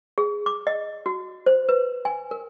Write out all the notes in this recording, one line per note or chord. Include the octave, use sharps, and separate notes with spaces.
G#4
D6
D#5
F#4
C5
B4
G#5
A#4